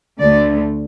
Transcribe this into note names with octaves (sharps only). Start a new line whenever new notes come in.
D2 D3 A3 D5